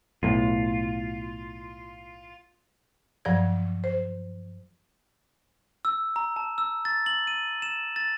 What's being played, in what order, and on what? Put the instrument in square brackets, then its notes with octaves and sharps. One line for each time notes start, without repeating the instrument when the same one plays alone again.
[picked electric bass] B1 A2 [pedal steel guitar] F4
[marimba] G2 F3 F#3 D5 G#6
C5
[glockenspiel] E6
A#5
A5
E6
A6
F#7
D#7
E7
A6